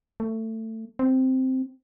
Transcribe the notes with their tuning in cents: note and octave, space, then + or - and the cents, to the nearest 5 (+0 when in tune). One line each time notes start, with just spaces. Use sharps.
A3 +20
C4 -5